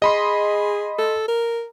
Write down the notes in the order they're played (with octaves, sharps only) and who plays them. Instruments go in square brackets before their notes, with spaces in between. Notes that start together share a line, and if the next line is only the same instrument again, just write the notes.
[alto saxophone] G#4 [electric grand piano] D#5 B5 C6
[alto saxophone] A4
A#4